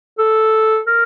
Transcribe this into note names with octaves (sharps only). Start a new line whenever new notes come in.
A4
A#4